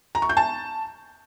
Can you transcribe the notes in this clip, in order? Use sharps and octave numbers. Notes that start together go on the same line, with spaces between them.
A#5
C#6
G6
A5